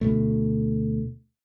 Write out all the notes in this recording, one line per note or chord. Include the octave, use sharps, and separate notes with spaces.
D2 B2 A3